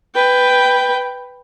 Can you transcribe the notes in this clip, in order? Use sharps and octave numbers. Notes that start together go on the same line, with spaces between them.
B4 G5